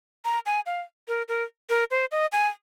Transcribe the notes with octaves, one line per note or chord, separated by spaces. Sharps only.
A#5
G#5
F5
A#4
A#4
A#4
C5
D#5
G#5